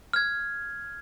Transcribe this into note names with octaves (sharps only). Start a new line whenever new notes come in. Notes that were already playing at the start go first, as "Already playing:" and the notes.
F6 G#6